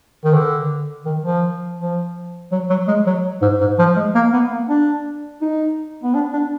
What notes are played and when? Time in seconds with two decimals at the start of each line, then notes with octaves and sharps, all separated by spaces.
0.25 D#3
0.34 D3
1.06 D#3
1.25 F3
1.79 F3
2.52 F#3
2.70 F#3
2.88 G#3
3.07 F#3
3.42 G#2
3.61 G#2
3.79 F3
3.97 G#3
4.15 A#3
4.33 B3
4.51 A#3
4.69 D4
5.42 D#4
6.04 B3
6.15 D4
6.34 D4